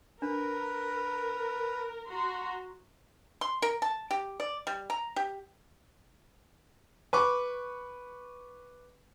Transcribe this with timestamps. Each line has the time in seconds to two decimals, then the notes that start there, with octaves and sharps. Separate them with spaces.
0.22 D4 A#4 B4
2.08 F#4 A#5 C6
3.41 C6
3.62 A#4
3.82 A5
4.11 G4
4.40 D5
4.67 G3
4.90 A#5
5.16 G4
7.13 B4 C#6 D6